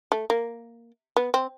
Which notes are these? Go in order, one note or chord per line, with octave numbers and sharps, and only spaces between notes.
A3
A#3
B3
C4